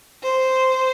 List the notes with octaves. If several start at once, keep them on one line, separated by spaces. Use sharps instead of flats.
C5